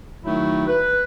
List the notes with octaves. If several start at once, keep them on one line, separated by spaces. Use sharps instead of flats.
D#3 F#3 A3 D#4 E4 F#4
B4